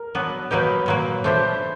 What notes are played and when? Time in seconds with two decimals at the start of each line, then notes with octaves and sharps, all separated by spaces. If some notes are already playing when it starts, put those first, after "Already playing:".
Already playing: A#4
0.15 F#3 B3 D4
0.51 F#3 A#3 D#4 G4 B4
0.86 A#2 F#3 A#3
1.24 A3 D4 G4 C5